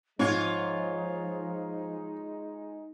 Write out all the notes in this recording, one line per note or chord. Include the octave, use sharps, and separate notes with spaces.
G#2 F3 G#3 D#4 F4 C#5